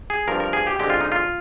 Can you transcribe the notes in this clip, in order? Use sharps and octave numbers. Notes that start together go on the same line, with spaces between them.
G#4
G2 F3 C4 A#4
A#4
G#4
G4
D3 G#3 C4 G4
F4
D#4
F4